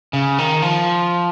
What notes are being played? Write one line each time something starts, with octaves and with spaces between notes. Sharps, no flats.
C#3
D#3
F3